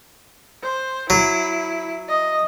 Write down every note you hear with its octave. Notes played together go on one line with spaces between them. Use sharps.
C5
F#3 E4
D#5